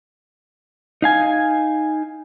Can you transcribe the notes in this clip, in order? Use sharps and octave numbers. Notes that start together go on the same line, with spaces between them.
D#4 F5 G#5